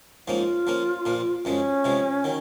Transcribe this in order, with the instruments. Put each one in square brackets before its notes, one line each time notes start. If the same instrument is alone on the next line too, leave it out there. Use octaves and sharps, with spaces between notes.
[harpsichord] G#2 F3 A#3 C#4 [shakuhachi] F4
[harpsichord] F3 A#3 C#4
A#2 F3 A#3
[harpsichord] F#2 F3 G#3 [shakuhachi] C#4
[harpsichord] C3 F3 G#3
D#3 F#3